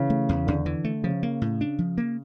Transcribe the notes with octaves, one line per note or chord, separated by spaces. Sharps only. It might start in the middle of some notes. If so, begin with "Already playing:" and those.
Already playing: C#3 E3
A3
E2
E2 D3
E3
A3
C#3 F3
A#3
A2
D4
F3
A#3